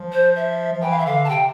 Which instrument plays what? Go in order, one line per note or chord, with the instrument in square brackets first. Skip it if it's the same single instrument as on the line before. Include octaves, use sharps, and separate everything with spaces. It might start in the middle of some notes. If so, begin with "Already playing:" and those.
Already playing: [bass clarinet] F3
[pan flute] C5
E5
[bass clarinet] F3
[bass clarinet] E3 [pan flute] G5
[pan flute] F5
E5
[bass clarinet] E3
[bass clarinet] D3 [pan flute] F5
[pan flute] A5
[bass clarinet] C3 [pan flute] G5